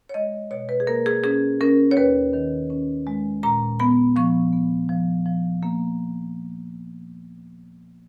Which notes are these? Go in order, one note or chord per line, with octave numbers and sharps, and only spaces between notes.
C#5
G#3 D#5
B2 C#5
B4
G#4
A#3 A#4
G#4
C#4 G#4
C#4 A#4
C#5
D#2 B4
D#3
C#4
G#3
A#2 A#5
B3 B5
F3 C#6
B3
F3
F3
A#3